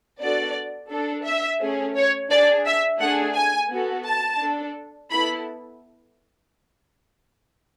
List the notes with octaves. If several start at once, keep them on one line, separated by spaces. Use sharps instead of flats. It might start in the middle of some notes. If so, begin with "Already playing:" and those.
B3 D4 F#4 A4 D5
D4 A4
E5
A3 C#4 G#4
C#5
D4 G#4 D5
E5
A3 D4 G#4 F#5
G#5
B3 F#4 A4
A5
D4 A4
B3 E4 A4 B5